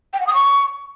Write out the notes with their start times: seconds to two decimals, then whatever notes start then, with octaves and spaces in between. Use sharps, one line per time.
0.13 G5
0.20 F#5
0.27 D#6
0.34 C#6